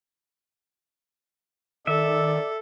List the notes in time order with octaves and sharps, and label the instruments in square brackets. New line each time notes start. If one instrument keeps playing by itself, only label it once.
[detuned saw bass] D#3 [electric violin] A4 [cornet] D5 [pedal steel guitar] E5